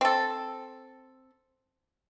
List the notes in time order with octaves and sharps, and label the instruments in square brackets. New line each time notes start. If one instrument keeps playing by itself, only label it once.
[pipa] C4 A4